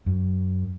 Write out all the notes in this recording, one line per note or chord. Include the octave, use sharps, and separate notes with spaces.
F#2